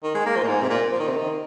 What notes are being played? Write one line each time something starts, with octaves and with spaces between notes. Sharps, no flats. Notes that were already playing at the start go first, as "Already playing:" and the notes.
D#3
G#3
A#3
F3
A#2
G#2
C3
A#2
F3
D#3
C3
D#3